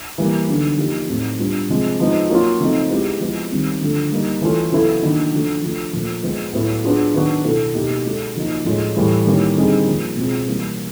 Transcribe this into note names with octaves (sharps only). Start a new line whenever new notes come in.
E3 G3 A#3
D3 F#3 B3 D#4
F3 A#3 D#4 G4
A2 F#3 A3 C4 D#4
G3 B3 D4 F4
C3 F3 G#3
F3 G#3 B3 D#4
F#3 A#3 C#4 F4
C#3 F3 A3 C4 D#4
G#3 B3 E4 G4
F3 G#3 B3 E4
D#3 G3 C4
D3 F3 A3
G3 A#3 D#4
E3 A3 C#4 F4 A4
C#3 F#3 B3 E4 A4
D#3 F#3 A#3 D4
C#3 F3 A3 D4 F#4
F3 A3 D4 F4
A#2 F3 A3
F3 G#3 B3
A2 F#3 B3 E4
F#3 B3 D4 F4 G#4
D#3 F#3 B3 D4 F#4
B2 F#3 B3 E4 A4
B2 F#3 A#3 D#4 G4
G#3 C#4 F#4 A4
C#3 F3 A#3 D#4 F#4
A2 F3 G#3 C#4 F4
A2 E3 G3
D#3 G3 A#3 C#4 E4
D3 G3 C4 D#4 G#4
C#3 F3 A#3
B2 G#3 C4 F4 G#4
E3 G3 A#3 C#4